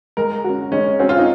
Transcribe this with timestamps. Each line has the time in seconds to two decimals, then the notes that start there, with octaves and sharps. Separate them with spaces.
0.17 G#3 A#4
0.45 C#4 F#4
0.72 G#3 C#4
0.99 C4 C#4 F#4
1.09 F4
1.18 D#4